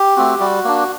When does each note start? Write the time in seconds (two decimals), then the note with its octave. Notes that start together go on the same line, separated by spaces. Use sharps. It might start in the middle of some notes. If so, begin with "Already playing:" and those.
Already playing: G4
0.16 A3 C4 F#4
0.40 G3 F#4
0.64 A#3 D4